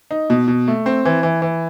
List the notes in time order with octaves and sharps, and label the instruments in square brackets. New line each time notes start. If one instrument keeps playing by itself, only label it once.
[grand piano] D#4
B2
B2
A3
C4
E3
E3
E3